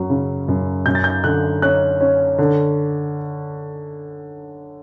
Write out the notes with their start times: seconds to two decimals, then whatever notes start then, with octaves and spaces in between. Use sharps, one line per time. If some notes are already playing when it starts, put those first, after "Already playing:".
Already playing: F#2 F#3
0.10 C#3
0.48 F#2
0.86 F#2 G6
0.95 A6
1.04 G6
1.24 D3 F#6
1.62 C#4 F#6
2.01 C#4
2.38 D3